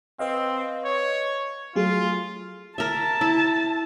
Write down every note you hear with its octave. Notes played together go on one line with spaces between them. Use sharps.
C4 B4 D#5 F5
C#5
F#3 A3 F4 G#4
A#4 E5 A5
E4